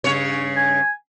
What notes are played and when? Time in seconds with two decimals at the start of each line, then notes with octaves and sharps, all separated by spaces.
0.04 G2 C#3 C#5
0.56 G#5